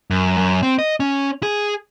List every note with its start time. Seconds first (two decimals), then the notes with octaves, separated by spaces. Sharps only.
0.11 F#2
0.38 F#2
0.63 C4
0.79 D#5
1.00 C#4
1.43 G#4